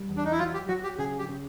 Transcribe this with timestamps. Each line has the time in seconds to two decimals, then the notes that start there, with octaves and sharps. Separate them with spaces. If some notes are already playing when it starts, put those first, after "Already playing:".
Already playing: G3
0.09 E2
0.16 D4
0.25 D#4
0.32 E4
0.39 F#3 F4
0.54 G4
0.68 F#3 F#4
0.83 G4
0.98 C#3 G#4
1.19 G4
1.29 C#3